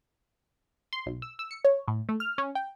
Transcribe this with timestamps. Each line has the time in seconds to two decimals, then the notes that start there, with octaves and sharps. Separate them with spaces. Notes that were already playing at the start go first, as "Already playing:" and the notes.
0.93 C6
1.06 B1
1.22 E6
1.39 E6
1.51 C#7
1.64 C#5
1.88 A2
2.09 A3
2.20 F6
2.38 C#4
2.55 G5